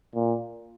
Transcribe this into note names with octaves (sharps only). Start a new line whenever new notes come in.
A#2